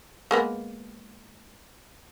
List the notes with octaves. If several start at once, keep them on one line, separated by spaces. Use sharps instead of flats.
G#3 A#3 B3